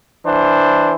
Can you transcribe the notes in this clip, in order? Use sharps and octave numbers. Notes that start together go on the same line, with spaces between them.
E3 D4 C5